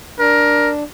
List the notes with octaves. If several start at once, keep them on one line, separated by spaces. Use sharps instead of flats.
D4 A#4